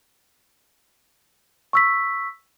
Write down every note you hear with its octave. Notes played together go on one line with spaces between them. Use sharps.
C#6 E6 B6